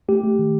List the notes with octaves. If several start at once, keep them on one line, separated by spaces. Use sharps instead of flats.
A3 G4
A3
D#3